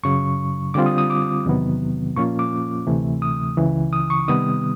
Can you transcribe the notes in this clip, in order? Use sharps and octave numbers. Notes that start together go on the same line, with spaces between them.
F#2 C#3 F#3 C#6
D3 G3 C4 F4 D6
D#6
D#6
D6
E2 C3 D#3 F#3 B3
A#2 F3 A#3 C#4 F4 C#6
D6
D2 C3 E3 A3
D#6
C#2 C#3 E3
D#6
C#6
C3 D#3 G3 B3 D#6